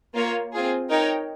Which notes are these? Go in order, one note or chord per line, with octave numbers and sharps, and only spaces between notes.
A#3 F4 A#4 C#5
C4 F4 G#4
D#4 A#4 C#5 G5